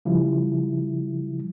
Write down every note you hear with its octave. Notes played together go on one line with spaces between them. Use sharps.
C#3 F3 G3 E4